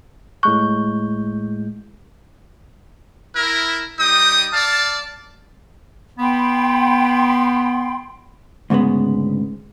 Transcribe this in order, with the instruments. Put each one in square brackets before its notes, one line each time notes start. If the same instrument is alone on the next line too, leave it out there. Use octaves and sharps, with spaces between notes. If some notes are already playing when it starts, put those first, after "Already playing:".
[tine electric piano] A2 G#3 G6 [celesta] C#6 F#6
[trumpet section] E4 A#4
G3 D#4 G5 D#6
D5 F5 A5
[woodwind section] B3 [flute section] G5 B5 C6
[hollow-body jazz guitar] D2 G#2 C#3 G#3 B3